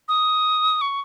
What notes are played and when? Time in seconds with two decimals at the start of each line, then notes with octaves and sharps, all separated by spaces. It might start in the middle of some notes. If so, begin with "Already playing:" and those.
0.08 D#6
0.81 C#6